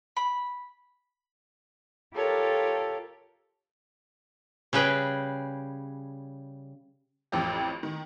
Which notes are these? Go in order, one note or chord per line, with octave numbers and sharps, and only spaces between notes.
B5
F4 G4 A4 A#4 C#5
C#3 G3 G#4 B4 G5
A1 F2 G4
D#3